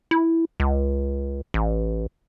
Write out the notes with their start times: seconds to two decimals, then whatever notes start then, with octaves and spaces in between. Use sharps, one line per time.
0.11 E4
0.60 C#2
1.54 A1